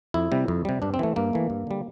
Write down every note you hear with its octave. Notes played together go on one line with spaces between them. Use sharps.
F2 E4
C3 G3
F2
C3 G3
G2 D4
C4
E3 A3
G2 A#3
E3 A3
G2
D3 G3